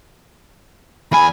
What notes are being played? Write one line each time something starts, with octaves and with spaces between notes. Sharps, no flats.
E2 G#5 B5